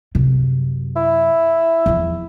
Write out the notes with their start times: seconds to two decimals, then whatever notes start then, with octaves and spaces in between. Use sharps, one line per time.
0.15 F#2 C3
0.96 E4
1.86 E2 F3